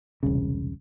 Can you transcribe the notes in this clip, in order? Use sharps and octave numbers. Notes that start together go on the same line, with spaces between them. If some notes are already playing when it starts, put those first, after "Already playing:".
E1 C2 C#3